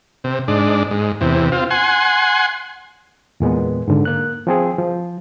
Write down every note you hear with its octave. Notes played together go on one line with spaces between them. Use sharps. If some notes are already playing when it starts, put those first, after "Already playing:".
C3
G#2 D4
G#2
E2 C3
C4 F4
F#5 G#5 C6
E2 A#2 G#3 B3
G#2 D3
A#3 F#6
F3 C4 G#4
F3